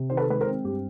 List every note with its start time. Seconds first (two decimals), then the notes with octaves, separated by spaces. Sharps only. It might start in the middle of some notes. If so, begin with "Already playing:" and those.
Already playing: C3
0.10 D#3 C5
0.17 A4 B4
0.29 G#3 B4
0.41 A#4 C5
0.47 C4
0.64 G2 G4